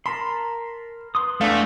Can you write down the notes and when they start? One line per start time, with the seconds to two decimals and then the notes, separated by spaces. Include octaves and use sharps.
0.06 A#4 A5 B5 C6
1.15 B4 C6 D#6
1.41 E2 A3 D4 F5